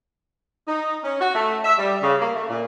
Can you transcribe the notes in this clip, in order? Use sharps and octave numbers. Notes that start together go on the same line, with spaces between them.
D#4
C#4
F#4
A3
E5
G3
C#3
A#3
A3
A#2